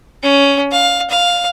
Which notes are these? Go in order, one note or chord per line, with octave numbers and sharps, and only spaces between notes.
C#4
F5
F5